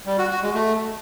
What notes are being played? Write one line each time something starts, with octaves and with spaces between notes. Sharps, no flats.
G3
F#4
F#4
G#3
A3